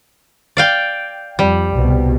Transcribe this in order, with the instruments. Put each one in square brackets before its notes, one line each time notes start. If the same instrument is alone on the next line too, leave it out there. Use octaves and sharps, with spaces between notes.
[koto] D5 F5 G5
[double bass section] F2 [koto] G3
[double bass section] C2 B2